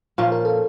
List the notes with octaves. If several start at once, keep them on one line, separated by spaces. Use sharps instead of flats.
A#2 F3 C#4 A#4
A#4
A4